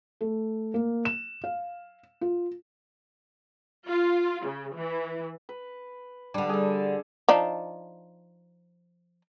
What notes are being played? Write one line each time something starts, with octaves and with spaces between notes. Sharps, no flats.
A3
A#3
E7
F5
F4
F4
C#3
E3
B4
D3 G3 D4
G#4 A4
F3 D4 D#4